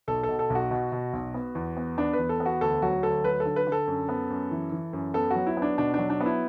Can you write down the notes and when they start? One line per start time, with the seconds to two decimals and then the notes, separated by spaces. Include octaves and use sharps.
0.08 B1 A4
0.23 A4
0.29 B2
0.39 A4
0.50 B1
0.55 F#4
0.71 B2
0.92 B2
1.13 B1
1.34 B3
1.55 E2
1.77 B3
1.98 B3 D4
2.13 B4
2.19 E2
2.29 A4
2.40 B3
2.46 F#4
2.61 D2 A4
2.82 F#3 F#4
3.03 D2 A4
3.24 F#3 B4
3.40 A4
3.46 D3
3.56 B4
3.67 D3
3.72 A4
3.87 F#2
4.09 B3
4.30 F#2
4.51 E3
4.72 E3
4.93 F#2
5.14 B3 A4
5.31 F#3 F#4
5.47 E4
5.57 B3
5.62 D4
5.78 B2 D4
5.94 F#3 D4
6.10 D4
6.21 B3
6.26 E4